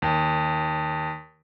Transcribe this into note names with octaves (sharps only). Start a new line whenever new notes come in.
D#2